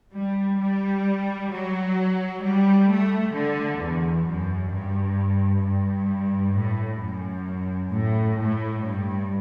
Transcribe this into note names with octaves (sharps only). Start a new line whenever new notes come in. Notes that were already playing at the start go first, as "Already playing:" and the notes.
G3
G3
F#3
G3
A3
D3
E2
F#2
G2
G2
A2
F#2
A2
A2
G2